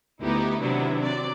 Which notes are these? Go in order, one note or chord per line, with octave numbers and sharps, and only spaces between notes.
D2 B3 D#4 E4 G4
C3 D#3 F#3 B3 D4 E4
F#3 C4 D5